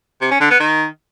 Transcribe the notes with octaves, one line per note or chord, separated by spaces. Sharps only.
C3
C#4
D3
B3
D#3